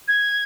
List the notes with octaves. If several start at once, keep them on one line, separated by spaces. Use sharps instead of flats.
G#6